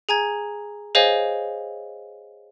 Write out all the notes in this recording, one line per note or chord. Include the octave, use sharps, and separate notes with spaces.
G#4 G#5 A#5 G#6
G#4 C5 C#5 D#5 F5 G#5